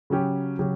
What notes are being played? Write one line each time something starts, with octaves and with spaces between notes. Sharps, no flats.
C#3 F#3 C#4 G4
C#3 F#3 C#4 G4